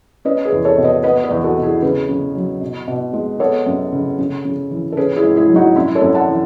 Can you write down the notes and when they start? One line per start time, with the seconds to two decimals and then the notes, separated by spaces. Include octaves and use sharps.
0.25 C#4 B4 D#5
0.45 G#4 B4
0.52 E2
0.65 A4 C#5
0.78 B2
0.84 B4 D#5
1.03 B3 B4 D#5
1.24 B4 D#5
1.30 E2
1.43 F#4 A4
1.57 B2
1.63 E4 G#4
1.82 C#3 G#4 B4
2.09 C#3
2.35 F#3
2.61 B2
2.87 B2
3.13 G#3
3.39 B3 A4 C#5
3.66 F#2
3.92 C#3
4.19 C#3
4.45 C#3
4.71 E3
4.92 A4
4.97 C#4 G#4 B4
5.16 E4 G#4
5.24 G#2
5.36 E4 G#4
5.49 F#3
5.56 D#4 F#4
5.76 F#2 E4
5.95 A4 C#5
6.02 F#2
6.15 F#5 A5
6.28 E3